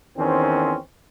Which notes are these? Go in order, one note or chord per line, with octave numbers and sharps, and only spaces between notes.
E2 D#3 C4 C#4 C5